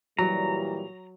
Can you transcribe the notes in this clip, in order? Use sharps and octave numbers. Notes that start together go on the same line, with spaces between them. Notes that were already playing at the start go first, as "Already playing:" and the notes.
A#2 E3 F#3 G3 A#5